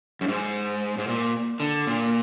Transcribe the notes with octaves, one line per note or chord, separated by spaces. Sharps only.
F#2
G#2
G#2
A#2
D3
A#2